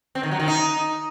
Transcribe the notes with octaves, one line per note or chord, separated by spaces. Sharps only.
C4
D#3
F#3
D#3
D#4